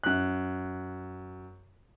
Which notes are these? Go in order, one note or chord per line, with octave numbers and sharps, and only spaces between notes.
F#2 F#6